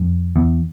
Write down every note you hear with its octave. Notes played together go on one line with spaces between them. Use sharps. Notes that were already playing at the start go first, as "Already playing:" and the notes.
Already playing: F2
E2